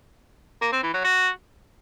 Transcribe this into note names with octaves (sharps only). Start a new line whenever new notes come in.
A#3
C4
E3
F#3
F#4